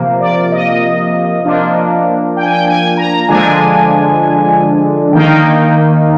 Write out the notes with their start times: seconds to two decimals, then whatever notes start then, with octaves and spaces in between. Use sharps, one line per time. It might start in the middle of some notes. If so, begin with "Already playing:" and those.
Already playing: C3 F3 A#3
0.21 D5
0.52 D#5
1.44 F3 A#3 D4
2.37 G5
2.43 G#5
2.51 G5
2.67 G#5
2.97 A#5
3.28 D3 F3 G#3 D4 G#5
5.13 D#3 A#3 D#4 G5